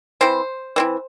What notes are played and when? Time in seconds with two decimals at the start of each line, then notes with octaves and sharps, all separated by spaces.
0.21 E3 C4 E4 C5
0.76 E3 C4 E4